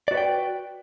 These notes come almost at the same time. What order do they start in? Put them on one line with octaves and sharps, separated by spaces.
D5 F#4 B4 G5